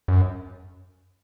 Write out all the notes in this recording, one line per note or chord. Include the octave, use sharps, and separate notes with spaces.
F#2